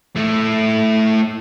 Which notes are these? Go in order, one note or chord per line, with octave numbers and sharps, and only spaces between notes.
A3 E4